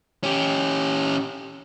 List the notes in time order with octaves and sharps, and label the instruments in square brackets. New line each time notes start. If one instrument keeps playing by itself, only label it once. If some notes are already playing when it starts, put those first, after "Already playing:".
[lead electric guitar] C#4 G4